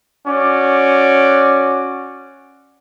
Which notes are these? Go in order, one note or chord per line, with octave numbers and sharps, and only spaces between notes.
C#4 F#4 D5